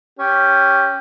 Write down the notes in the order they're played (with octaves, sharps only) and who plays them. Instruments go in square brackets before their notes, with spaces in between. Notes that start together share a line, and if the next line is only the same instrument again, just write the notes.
[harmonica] C#4 G4